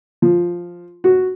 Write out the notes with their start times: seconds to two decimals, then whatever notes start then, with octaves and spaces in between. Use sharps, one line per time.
0.22 F3
1.04 F#4